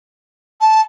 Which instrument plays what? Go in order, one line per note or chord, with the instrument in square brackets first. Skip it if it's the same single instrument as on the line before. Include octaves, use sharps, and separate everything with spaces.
[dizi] A5